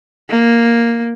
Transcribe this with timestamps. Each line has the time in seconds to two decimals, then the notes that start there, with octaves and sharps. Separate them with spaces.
0.30 A#3